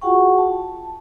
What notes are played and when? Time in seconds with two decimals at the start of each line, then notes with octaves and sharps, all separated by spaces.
0.01 F4 F#4 G#4 F#5 G5 C#6
0.38 A5